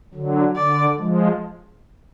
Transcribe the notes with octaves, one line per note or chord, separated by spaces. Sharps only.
D3 F#3
D3 D5
F3 G#3